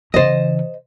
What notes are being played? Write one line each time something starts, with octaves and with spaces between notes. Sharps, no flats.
C#3 E3 C5 D#5